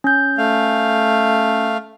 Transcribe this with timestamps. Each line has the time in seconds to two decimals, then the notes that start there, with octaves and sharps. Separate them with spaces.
0.04 C#4 G6
0.38 A3 F5